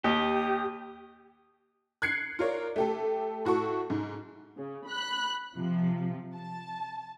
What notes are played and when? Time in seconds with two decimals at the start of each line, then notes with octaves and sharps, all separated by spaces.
0.04 D#2 G4 D#6
2.02 F#6 G#6 C7 C#7
2.39 F4 A#4 C#5 D5
2.76 A3 G4 A4
3.45 A2 F#4 A4 C#6
3.90 G#2
4.58 C#3
4.87 B5 F#6
5.55 C3 F3
6.36 A5